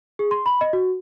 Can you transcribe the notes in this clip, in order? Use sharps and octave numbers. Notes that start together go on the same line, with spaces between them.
G#4
C6
B5
D#5
F#4